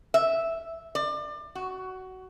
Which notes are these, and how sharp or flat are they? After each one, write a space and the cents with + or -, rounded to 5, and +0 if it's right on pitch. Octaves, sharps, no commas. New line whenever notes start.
E5 -5
D5 +30
F#4 +15